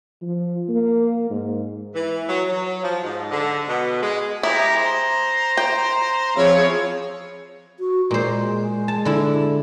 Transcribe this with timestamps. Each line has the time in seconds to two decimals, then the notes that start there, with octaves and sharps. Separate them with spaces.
0.22 F3
0.69 A#3
1.31 G#2
1.94 E3
2.27 F#3
2.48 F#3
2.83 F3
3.04 G#2
3.31 D3
3.68 B2
4.02 G#3
4.43 G#3 E4 G4 A#5
4.77 C5 A#5
5.57 G5
6.36 F3 C4 E4 G#4 C#5 F5
7.79 F#4
8.11 A#2 G#3 C5
8.88 A5
9.05 D3 E4